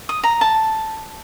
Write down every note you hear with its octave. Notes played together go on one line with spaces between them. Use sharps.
D#6
A#5
A5